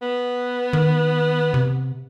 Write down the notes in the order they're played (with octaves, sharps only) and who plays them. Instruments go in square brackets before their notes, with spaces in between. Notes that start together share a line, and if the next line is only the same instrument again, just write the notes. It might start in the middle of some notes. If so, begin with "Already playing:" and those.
[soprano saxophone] B3
[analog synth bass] D#3
C3